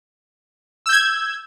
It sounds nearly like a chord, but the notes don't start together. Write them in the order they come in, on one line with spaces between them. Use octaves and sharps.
E6 G6 G#6